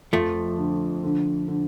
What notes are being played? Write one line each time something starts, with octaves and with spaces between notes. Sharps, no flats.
F2 F3 A3
D3
D3
D3